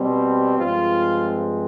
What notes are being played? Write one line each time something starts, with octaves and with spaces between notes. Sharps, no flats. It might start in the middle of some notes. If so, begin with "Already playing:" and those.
Already playing: B2 G3 C4
G2 F3 G#3 C4 F4